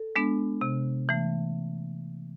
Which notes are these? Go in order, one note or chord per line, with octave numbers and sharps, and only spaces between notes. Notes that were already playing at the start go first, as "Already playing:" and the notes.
Already playing: A4
G#3 B3 D4
C3
E3 A3